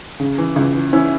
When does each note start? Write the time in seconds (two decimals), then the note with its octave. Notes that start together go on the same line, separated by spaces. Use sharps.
0.20 C#3
0.38 E3
0.56 C#2
0.74 E3
0.93 E3 C#4 E4